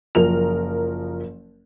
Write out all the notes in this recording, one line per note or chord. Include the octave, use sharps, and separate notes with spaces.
F#1 F3 A#4 F7